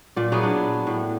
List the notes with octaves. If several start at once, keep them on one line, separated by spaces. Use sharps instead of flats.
A#2 D5
F#3 B3 E4 G#4
D4
A2